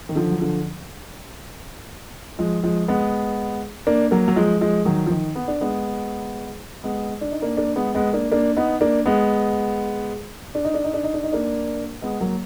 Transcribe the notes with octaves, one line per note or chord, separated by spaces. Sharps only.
D#3
D3 F3
F#3
D3 F3
F3 G#3
F3 G#3
G#3 B3
A#3 D4
F#3 A#3
F#3
F3 G#3
F3 G#3
D#3 F#3
F3
D#3
B3
D4
G#3 B3
G#3 B3
D4
D#4
A#3 D4
A#3 D4
G#3 B3
G#3 B3
A#3 D4
A#3 D4
B3 D#4
A#3 D4
G#3 B3
D4
D#4
D4
D#4
D4
D#4
D4
D#4
A#3 D4
G#3 B3
F#3 A#3